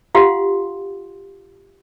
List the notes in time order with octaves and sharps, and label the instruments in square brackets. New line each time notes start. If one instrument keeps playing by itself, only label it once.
[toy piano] F4 G4 F5 F#5 C6